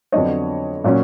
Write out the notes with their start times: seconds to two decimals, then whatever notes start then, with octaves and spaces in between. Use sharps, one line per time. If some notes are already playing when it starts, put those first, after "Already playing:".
0.12 F2 D3 F#3 B3 D4 C#5 D#5
0.84 A#2 F#3 A#3 C#4